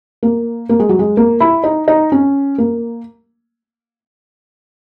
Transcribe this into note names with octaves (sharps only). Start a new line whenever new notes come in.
A#3
A#3
G#3
F#3
G#3
A#3
E4
D#4
D#4
C#4
A#3